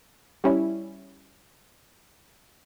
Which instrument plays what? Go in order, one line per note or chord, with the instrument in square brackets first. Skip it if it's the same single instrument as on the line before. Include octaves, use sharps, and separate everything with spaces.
[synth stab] G3 C#4 E4